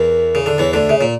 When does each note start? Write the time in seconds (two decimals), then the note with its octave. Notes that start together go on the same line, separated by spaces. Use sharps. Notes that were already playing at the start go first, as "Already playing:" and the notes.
Already playing: E2 E3 A#4
0.35 C#3
0.46 D3
0.58 E2 E3 C#5
0.73 D2 D3 D5
0.89 C#3 E5
0.97 C#5
1.01 A#2